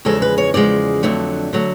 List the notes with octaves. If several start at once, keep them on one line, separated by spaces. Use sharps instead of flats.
E2 C#3 F3 G#3 A4
B4
C#5
E2 C#3 F3 G#3 D5
F2 D3 F#3 A3
D3 F#3 A3